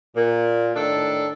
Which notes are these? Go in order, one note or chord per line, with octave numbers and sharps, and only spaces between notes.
A#2
A2 D#3 D4 A4